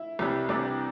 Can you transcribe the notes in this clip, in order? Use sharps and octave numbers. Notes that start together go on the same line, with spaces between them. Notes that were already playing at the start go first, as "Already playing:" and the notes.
Already playing: E4 E5
C2 C3 E3 G3
C2 C3 E3 G3 D4 D5